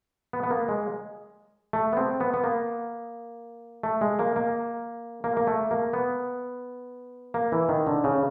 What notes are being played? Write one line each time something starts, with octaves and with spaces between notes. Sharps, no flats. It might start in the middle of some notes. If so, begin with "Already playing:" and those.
B3
B3
A#3
G#3
A3
B3
C4
B3
B3
A#3
A3
G#3
A#3
A#3
A#3
A#3
A3
A#3
B3
A#3
E3
D#3
D3
C#3